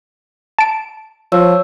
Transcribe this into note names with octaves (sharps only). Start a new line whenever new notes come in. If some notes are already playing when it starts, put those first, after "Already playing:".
A5 D7
F3 C#5 E6